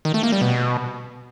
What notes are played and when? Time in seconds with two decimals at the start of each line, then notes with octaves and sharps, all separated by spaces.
0.05 D#3
0.14 A3
0.23 A#3
0.32 G3
0.41 B2